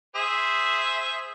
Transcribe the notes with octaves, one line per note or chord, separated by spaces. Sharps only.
G#4 C5 E5